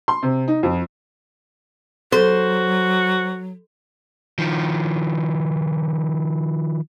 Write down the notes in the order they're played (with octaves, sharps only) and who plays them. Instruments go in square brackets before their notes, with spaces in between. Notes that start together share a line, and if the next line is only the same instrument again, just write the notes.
[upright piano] C6
C3
D#4
F2
[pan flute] F#3 [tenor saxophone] F#4 [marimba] A4 [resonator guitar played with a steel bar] C5
[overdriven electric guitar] D#3 F3